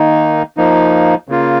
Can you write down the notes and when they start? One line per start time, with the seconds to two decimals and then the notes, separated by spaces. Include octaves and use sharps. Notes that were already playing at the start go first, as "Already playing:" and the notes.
Already playing: D#3 A#3 D#4
0.57 F3 A#3 D#4
1.28 C#3 A#3 F4